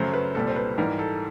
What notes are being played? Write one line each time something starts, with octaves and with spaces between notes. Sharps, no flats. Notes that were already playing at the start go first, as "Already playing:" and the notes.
Already playing: F#2 C#3 F#3 A3 C5
B4
C2 A#2 G3 A4
C5
B4
G#2 E3 G3 A#4
A4